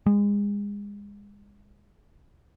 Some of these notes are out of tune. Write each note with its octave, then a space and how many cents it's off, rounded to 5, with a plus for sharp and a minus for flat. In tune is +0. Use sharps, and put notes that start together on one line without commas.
G#3 -30